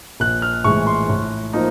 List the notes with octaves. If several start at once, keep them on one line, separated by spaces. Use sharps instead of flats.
A#1 F#6
F6
A2 E3 G#3 C#6
C6
A2
F3 A#3 D#4